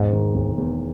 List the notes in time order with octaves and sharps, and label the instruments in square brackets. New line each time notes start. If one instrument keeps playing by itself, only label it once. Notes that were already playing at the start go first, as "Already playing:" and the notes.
Already playing: [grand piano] E1 [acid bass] G#2
[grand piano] D#3
E1
E2